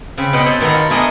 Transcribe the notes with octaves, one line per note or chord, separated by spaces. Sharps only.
C#3 C4 B5
B2 B4 C5 D#5 F#5 G5
C4 A4 C5 C#5 C6
B2 D#3 B3 A4 A#5
F4
B2 A3 D4 G#4 A#4 D#5